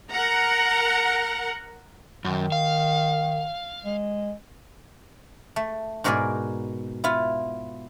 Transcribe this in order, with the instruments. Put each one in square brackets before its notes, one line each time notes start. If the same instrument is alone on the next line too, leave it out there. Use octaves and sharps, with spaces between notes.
[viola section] A#4 F#5 A#5
[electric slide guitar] F#2 [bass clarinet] D#3
[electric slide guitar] F5
[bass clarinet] G#3
[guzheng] A3
G#2 B2 F#4 A#4 D5 G#5
B3 E4 F4